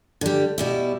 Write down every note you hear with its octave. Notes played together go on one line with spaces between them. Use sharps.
D3 G3
B2 G3 E4